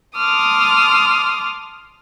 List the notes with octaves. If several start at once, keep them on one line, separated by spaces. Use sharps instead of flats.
A5 C6 D6 D#6 F6